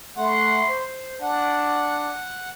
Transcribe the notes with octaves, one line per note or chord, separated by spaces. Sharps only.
A3 F#5 C6
C5
D4 F#5